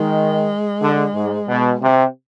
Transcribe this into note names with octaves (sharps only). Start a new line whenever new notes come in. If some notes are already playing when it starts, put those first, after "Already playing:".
Already playing: D#3 G#3
D3
G#2
B2
C3